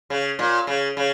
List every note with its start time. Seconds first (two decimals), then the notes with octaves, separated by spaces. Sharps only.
0.10 C#3
0.39 A#2
0.67 C#3
0.97 C#3